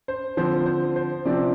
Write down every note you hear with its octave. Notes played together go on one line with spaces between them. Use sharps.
C5
D3 F3 C4 C5
C5
C5
C3 F3 C4 D5